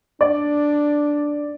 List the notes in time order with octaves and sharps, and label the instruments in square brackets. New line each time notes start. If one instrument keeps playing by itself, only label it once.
[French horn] D4 [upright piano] D5